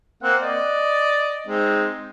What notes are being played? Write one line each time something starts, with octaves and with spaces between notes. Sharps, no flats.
A#3 C4 F#5
D5 D#5
G#3 C4 D#4